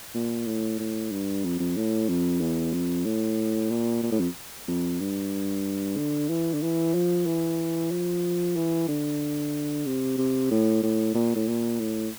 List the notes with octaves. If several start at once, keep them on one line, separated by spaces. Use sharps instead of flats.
A#2
A2
A2
G2
F2
F2
A2
F2
E2
F2
A2
A#2
A#2
A2
F2
F2
G2
D3
E3
D3
E3
F3
E3
F3
E3
D3
C3
C3
A2
A2
A#2
A2
A#2
A2